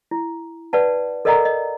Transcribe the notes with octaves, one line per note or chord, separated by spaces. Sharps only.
E4
B4 D5 F#5 A5
A4 A#4 D5 D#5 F#5 A#5
D#5